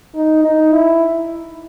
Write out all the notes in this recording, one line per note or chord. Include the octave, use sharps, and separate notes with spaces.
D#4
D#4
E4